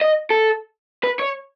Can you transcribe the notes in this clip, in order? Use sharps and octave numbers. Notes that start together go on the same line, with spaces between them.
D#5
A4
B4
C#5